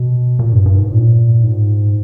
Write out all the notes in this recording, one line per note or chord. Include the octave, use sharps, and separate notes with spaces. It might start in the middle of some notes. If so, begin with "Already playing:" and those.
Already playing: B2
A#2
G2
G2
G#2
A#2
G#2